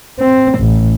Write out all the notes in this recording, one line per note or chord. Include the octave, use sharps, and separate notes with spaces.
C4
A1